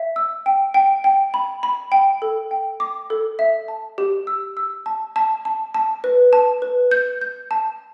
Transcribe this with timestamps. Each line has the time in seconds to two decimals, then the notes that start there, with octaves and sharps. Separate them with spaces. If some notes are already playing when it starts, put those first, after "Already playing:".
Already playing: E5
0.16 E6
0.46 G5
0.74 G5
1.04 G5
1.34 B5
1.63 B5
1.92 G5
2.22 A4
2.51 G5
2.80 D6
3.10 A4
3.39 E5
3.68 A5
3.98 G4
4.27 E6
4.57 E6
4.86 A5
5.16 A5
5.45 A5
5.74 A5
6.04 B4
6.33 A5
6.62 B4
6.91 G6
7.21 G6
7.51 A5